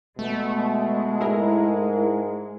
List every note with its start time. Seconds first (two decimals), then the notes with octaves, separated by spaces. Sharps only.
0.19 B2 G#3 A3
1.21 G#2 E4 G#4 A#4